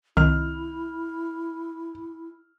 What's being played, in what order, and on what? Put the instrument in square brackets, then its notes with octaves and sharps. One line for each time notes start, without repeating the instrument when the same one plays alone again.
[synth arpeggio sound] C2 D#3 [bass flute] E4 [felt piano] F6